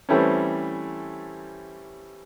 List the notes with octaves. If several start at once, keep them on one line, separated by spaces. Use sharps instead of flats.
E3 G3 A3 C4 C#4